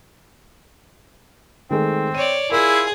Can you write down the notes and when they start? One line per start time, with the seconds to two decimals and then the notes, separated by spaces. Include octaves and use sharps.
1.71 D#3 G#3 A3 C4
2.15 C#5 D5 D#7
2.52 E4 F4 G#4 A#4